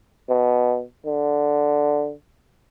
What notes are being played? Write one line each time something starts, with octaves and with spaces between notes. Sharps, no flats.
B2
D3